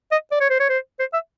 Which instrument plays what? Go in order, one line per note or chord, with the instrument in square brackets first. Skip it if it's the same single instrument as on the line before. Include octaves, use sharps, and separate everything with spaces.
[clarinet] D#5
D5
C#5
C5
C#5
C5
C5
E5